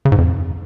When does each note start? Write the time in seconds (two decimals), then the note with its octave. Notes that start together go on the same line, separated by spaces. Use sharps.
0.05 C#3
0.12 G#2
0.18 F2